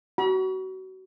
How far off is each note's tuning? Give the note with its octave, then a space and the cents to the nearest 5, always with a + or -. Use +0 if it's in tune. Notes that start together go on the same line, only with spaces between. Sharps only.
F#4 +30 B5 -45